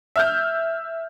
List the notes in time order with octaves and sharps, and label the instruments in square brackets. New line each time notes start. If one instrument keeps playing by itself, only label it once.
[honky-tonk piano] E5 F6 G6